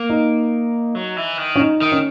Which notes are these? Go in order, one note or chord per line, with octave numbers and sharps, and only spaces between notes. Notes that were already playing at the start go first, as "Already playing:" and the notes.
Already playing: A#3
D#4
F#3
E3
D#3
C#4
D#4
D#3
C#4